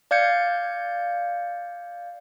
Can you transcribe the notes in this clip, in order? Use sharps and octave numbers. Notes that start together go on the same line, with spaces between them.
D5 F5 G6 G#6 C#7